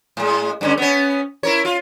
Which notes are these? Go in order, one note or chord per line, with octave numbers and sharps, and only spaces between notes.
A2 G#3
G2 D3 C#4
B3 C#4
E4 A#4 C#5
F4